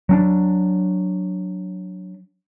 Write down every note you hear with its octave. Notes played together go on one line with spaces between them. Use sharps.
F#3 C4 D4